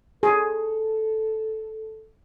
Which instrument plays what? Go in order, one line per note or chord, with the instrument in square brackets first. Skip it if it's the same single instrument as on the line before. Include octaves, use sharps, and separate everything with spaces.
[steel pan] G#4 [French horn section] A4